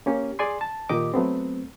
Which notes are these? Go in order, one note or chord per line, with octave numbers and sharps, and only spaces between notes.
A#3 C#4 G4
G#4 D5 G#5 C6
A5
A#2 D#3 A#3 G4 D#5 D6
F#3 A3 B3 C4